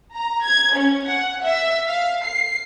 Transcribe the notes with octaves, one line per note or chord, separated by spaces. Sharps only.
A#5
G#6
C#4
F#5
E5
F5
C7